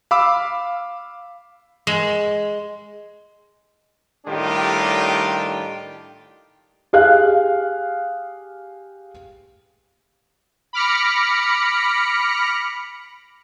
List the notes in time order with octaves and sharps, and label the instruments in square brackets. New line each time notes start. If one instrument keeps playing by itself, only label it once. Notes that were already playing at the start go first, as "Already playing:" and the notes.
[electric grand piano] F5 B5 D6 E6
[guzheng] G#3
[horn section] A2 D#3 G3 D4 F4 G4
[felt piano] G4 G#4 F5 F#6
[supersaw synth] B5 D6 F6 A#6 C#7